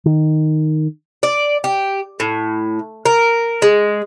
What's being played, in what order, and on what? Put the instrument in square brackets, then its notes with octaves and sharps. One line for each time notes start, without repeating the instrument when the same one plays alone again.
[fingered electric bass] D#3
[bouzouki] D5
G4
A2
A#4
G#3